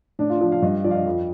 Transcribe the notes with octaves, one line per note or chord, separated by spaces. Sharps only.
A2 D4
F4
F3
F5
G2 D#5
F3 D5
F5
D#5
F2